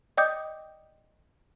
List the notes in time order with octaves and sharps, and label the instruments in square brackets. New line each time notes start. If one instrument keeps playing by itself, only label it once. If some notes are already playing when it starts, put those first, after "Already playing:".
[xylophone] D5 D#5 G5 D6 D#6 G6